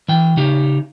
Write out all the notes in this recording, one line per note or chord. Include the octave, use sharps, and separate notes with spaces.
E3 G5
C#3 D#4 G4